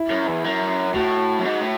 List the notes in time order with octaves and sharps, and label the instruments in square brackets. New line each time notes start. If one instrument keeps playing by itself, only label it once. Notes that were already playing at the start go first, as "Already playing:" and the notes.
Already playing: [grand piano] E4
[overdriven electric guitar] F#2
E2
F#2
[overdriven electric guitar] A2 [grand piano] F#4
[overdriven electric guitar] F#2
G#2
A2